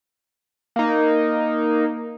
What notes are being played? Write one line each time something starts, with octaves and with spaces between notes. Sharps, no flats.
A#3 D#4